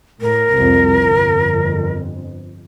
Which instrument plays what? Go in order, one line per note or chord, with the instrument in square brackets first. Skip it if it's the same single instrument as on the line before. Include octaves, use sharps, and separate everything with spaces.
[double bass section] A2 [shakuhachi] A#4
[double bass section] C2 F2
G1 F2